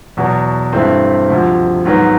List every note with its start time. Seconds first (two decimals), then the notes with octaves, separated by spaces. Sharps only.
0.17 E2 B2 F#3
0.73 G2 E3 A3 C4
1.30 D2 C3 F3
1.85 G#2 D#3 F#3 B3